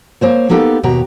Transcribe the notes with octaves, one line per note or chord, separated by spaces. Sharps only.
A#3 C5 C#5
A#3 B3 D#4 G4 A4
D#2 B2 F#4 G4 A#5